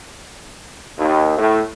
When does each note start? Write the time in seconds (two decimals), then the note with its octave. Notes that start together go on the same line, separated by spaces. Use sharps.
0.99 D#2
1.38 A2